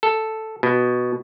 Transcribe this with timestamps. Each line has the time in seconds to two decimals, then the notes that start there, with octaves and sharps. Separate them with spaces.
0.03 A4
0.63 B2